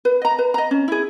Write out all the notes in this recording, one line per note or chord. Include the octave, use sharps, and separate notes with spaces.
B4
D#5 A#5
B4
D#5 A#5
C#4
E4 G#4